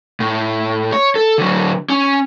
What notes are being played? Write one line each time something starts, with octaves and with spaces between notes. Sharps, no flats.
A2
C#5
A4
D3 F#3
C#4